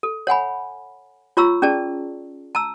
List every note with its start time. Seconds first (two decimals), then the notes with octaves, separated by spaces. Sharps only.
0.03 A4
0.27 C#5 F#5 G#5 B5
1.37 F4 C#5 A#5 C#6 E6
1.62 C#4 G#4 D5 A5
2.55 A5 A#5 E6